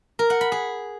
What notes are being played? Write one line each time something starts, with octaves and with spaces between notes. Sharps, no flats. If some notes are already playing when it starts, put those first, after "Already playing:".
A#4
F#5
B5
G#4